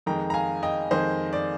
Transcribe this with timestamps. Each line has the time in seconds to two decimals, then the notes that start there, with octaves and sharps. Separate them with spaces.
0.06 F2 D#3 G#3 G5 A#5
0.30 A#5
0.34 F5 G#5
0.63 D#5 G5
0.91 F2 D#3 G#3 C5 D#5
1.33 D5